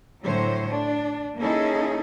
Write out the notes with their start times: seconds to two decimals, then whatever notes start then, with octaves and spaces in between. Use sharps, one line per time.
0.24 A2 D3 F#3 C5 C#5
0.69 D4
1.39 A#3 C#4 D#4 E4 G#4 A4